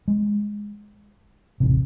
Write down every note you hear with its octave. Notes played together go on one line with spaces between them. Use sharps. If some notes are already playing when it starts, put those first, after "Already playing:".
G#3
D#1 A1 C3